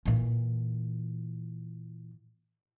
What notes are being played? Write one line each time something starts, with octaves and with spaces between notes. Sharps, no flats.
A#2 E3